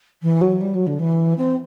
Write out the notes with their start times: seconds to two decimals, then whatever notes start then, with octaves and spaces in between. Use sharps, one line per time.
0.22 E3
0.40 F#3
0.60 G3
0.73 F#3
0.86 D3
0.98 E3
1.37 C4